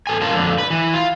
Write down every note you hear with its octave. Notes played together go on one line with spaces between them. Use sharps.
E2 A4 G#5
G2 C#4 F4 A#4 A5
F2 D3
B4
E3
F4